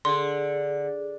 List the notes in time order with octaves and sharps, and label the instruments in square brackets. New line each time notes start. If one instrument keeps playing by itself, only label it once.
[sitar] D3 [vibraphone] G#4 [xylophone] C6